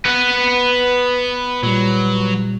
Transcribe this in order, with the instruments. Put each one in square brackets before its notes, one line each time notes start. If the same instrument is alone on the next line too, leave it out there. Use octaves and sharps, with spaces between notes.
[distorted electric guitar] B3 [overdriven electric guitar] B4 F#5
[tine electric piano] A#2 G3 [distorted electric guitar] F#3